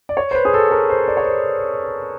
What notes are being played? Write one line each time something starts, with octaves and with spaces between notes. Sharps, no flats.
D5
C#5
C5
B4
G#4
A4
A#4
C5
D5
C#5
C5